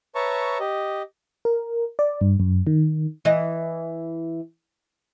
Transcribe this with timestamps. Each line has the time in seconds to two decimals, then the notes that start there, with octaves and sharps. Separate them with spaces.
0.15 B4 C#5 E5 A5 A#5 C#6
0.60 G4 D#5
1.45 A#4
1.99 D5
2.21 G2
2.40 F#2
2.67 D#3
3.25 E3 D#5